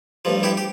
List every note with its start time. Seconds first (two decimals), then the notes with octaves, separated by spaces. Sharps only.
0.25 A1 G2 F3
0.43 E4 G4
0.57 G4